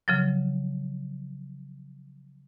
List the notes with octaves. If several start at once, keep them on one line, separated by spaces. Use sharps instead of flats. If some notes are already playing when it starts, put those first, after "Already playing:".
C#3 F3 F#3